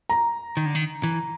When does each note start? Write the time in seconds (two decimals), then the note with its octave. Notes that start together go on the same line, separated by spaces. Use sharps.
0.09 A#5
0.57 D#3
0.66 D3
0.75 D#3
1.03 E3